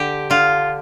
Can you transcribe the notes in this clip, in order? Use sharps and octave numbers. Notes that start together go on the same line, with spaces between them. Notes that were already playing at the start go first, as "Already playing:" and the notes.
Already playing: D3 G4
D3 F4